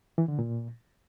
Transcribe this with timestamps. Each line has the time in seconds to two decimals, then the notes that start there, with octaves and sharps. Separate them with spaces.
0.18 E3
0.28 D3
0.39 A#2